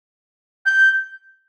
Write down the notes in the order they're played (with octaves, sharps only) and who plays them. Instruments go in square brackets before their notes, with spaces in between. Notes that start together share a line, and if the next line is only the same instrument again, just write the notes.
[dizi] G6